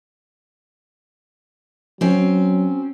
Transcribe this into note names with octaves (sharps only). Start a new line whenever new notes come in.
F#3 C4 C#4